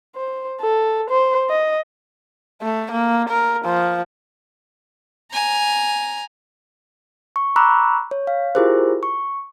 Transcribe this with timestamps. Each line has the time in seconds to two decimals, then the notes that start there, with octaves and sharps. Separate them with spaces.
0.16 C5
0.61 A4
1.10 C5
1.49 D#5
2.62 A3
2.91 A#3
3.29 A#4
3.64 F3
5.32 G#5 A#5
7.36 C#6
7.56 A#5 B5 C#6 D6 E6 F#6
8.11 C#5
8.27 F5
8.55 E4 F4 G4 G#4 A#4 C5
9.03 C#6